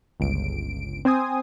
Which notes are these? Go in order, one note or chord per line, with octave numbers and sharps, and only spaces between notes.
G1 C#2 D7
C4 C5 G#5 D#6